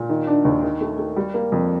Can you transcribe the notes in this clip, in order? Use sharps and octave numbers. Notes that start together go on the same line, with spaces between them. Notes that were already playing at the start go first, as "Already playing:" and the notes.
Already playing: A#2
D#3
D4
D#2
D#3
A3
A3
G3
A#3
F2